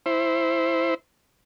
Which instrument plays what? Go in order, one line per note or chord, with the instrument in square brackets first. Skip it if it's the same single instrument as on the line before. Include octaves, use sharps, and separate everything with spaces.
[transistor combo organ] E4 C5